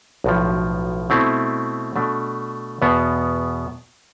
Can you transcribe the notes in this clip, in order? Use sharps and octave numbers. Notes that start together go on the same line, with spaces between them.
B1 A2 F3
B2 A3 C4 E4
B2 A3 D4
E2 B2 B3